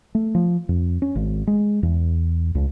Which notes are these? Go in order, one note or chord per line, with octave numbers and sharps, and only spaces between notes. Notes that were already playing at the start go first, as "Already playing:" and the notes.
A3
F3
F2
C#4
G#1
G#3
E2
C#2